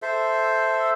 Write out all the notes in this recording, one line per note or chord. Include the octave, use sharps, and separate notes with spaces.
A4 C5 E5